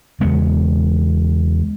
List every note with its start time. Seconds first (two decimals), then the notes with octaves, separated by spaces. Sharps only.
0.20 E2 C#3 G#3 B3